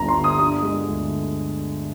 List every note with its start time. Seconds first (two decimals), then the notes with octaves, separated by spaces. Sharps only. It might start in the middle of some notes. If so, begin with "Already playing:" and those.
Already playing: G1 D2 G2 D3 A#5
0.09 C6
0.16 G1
0.24 D#6
0.39 D3 D#6
0.63 G#3
0.86 D2